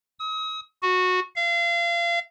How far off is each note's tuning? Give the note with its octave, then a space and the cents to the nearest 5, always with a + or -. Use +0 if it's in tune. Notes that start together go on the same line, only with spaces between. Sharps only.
D#6 +40
F#4 -15
F5 -30